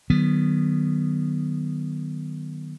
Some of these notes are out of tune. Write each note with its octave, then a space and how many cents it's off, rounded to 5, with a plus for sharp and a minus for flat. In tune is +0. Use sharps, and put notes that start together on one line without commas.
D#3 -20 F#3 +25 B3 +0